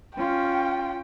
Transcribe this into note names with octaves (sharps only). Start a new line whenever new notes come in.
C#4 F4 G5